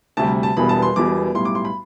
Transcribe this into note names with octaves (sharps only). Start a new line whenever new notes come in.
D2 C3 G3 A5
A5
E1 E2 B2 G3 B3 B5
A5
C6
E1 E2 B2 G3 D6
B1 A2 G3 C6
D6
C6
B5